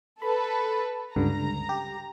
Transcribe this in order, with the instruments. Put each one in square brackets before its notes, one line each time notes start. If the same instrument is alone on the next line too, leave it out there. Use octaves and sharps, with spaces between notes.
[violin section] A4 B4 [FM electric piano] B5
[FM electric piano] C#2 G2 D3 [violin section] A#5
[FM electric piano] G4